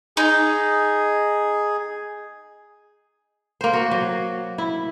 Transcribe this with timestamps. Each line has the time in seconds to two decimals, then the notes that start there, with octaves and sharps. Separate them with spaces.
0.17 D#4 G#4
3.61 A#3 C5
3.73 F#4
3.91 F#3
4.58 E4